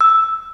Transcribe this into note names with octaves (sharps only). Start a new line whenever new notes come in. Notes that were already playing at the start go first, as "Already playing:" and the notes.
E6